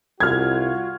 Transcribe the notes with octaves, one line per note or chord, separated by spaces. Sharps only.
C2 F4 F#4 F6 G#6